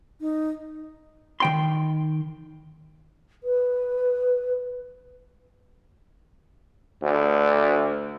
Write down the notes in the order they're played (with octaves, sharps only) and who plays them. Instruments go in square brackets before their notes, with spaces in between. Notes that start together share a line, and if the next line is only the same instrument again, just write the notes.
[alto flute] D#4
[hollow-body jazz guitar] D#3 G5 C6
[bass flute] B4
[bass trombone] D2